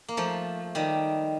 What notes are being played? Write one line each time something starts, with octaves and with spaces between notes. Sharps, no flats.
A#3
F3 A3
D#3 G3